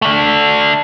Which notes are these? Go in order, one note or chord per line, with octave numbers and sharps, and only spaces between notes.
A3 D4